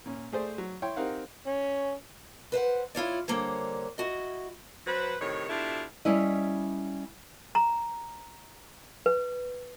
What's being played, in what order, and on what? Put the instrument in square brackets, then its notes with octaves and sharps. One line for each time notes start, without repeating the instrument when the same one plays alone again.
[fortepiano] A#2 C#4
A3 G#4 C5 D5
F#3
E4 C#5 G5 C6
C4 D#4 G4 A#4 F5 F#5
[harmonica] C#4
[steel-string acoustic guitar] B4 C5 F5 F#5
E4 F4 C#5 D5
D3 G3 A#3 C5 C#5
E4 F#4 D#5
[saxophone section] F#3 B4 C5
A2 C3 D#3 C#5
B2 D4 E4 F4 G4 A4
[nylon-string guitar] G3 C#4 E4 D#5
[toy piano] A#5
B4